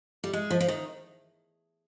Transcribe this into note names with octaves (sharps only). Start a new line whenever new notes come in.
G3
G#3
F3
F3
D#3